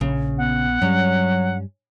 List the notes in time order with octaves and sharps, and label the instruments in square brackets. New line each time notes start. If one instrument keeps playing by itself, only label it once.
[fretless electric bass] A#1 [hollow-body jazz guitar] C#3
[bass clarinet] B3 [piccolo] F#5
[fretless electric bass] G2 G3 [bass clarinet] F#3 [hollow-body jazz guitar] C#4